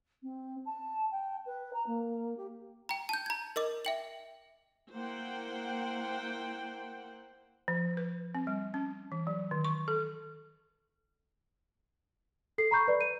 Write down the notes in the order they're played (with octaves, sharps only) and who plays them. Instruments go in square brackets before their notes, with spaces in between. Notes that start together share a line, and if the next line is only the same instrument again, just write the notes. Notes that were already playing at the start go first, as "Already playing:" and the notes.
[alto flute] C4
A5
G5
B4
A#5
A#3
G4
[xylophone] G5 A#5
A5 G6
A#5 G#6
A#4 D#5 D6
E5 G5 F#7
[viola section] A#3 E4 C5 F#5 G5
[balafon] F3
B4
C4
G3
C#4
E3
F#3
D#3
C#6
A4
[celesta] A4 C7
A#5 B5 C#6 G6
B4 D5
D#7